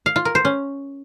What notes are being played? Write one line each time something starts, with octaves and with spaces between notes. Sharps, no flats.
F5
F4
A#4
C5
C#4